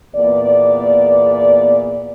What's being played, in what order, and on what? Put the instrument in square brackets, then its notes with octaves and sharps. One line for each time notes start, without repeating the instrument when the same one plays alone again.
[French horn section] E2 A#2 B3 D5